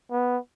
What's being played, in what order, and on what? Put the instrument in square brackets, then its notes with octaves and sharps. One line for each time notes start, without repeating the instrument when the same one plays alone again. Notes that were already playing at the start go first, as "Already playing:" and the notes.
[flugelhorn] B3